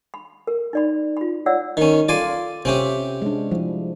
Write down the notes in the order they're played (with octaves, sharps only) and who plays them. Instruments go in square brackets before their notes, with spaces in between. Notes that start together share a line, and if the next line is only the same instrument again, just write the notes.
[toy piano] B5
A#4
D#4 D5 B5
F4 B5
E4 C#5 D5 F#5 E6
[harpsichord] D#3 C#4
[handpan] F4 A4 [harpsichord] D5 G#5 C6
[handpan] C3 E5 [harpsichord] C4 C#4 G4
[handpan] G#3 D4
F3 G3 E4